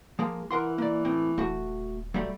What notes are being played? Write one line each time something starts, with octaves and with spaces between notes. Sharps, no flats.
F3 G#3 A#3
E3 A#4 F#5 C6
A#3 D5
A2 C4
D#1 A3 F#4
F#3 G3 A3